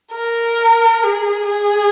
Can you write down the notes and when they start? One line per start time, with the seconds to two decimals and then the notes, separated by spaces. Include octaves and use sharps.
0.14 A#4
1.03 G#4
1.47 G#4